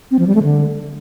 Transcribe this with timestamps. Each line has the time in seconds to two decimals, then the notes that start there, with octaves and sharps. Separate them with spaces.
0.11 C4
0.19 F3
0.27 G3
0.35 A3
0.43 D3